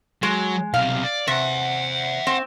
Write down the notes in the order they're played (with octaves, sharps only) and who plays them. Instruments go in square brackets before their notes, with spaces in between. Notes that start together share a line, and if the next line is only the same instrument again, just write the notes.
[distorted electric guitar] F#3 [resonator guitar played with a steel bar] G#3
[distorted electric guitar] B1 C3 [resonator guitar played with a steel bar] F5
[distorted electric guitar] D5
[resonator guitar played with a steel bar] C3 [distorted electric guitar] E5 F#5
[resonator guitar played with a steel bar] C4